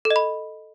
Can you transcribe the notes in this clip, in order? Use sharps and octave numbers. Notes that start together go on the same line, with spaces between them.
A4
D#5
B5